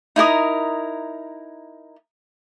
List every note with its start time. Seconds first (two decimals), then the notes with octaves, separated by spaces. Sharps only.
0.16 D#4 E4 A#4 D#6